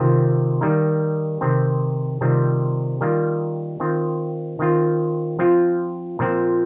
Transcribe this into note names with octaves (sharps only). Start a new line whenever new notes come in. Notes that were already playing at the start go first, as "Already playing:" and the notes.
Already playing: C3 D#3 C4 F4
D#3 G3 A#3 D#4
C3 D#3 C4
C3 D#3 G3 C4 F4
D#3 G3 A#3 F4
D#3 C4 F4
D#3 C4 F4
F3 C4 F4
A#2 F3 C4